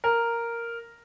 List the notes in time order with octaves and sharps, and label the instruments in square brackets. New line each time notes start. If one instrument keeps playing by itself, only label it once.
[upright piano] A#4